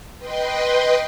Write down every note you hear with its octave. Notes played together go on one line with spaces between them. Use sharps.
B4 D#5 G5 C6